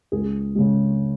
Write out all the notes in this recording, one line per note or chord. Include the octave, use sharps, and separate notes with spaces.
C#2 G#4
C#3 G#3